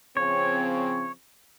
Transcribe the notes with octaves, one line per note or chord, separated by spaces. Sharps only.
C#3 F3 C4 C#5